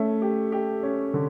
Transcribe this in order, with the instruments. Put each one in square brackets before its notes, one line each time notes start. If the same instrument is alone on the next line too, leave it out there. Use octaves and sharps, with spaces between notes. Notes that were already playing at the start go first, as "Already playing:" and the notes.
Already playing: [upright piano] A3 C#4
G4
G4
C#4
D3